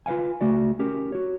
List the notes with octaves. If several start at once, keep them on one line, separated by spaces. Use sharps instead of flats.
F4 B4 C#5 F5 G#5
C#2 A3 F#4 D5
C#4 G4 A#4
F#4 C#5